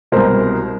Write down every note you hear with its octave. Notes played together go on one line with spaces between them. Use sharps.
C2 B2 A#4 C5